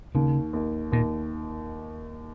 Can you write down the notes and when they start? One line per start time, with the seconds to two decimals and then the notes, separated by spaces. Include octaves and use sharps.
0.15 D#2 C#3
0.53 D#2
0.92 D#2 A#2